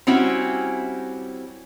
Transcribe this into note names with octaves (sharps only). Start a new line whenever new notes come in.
G3 C4 C#4 E4 F#4